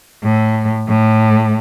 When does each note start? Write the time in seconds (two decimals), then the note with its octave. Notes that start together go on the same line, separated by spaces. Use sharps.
0.23 A2
0.88 A2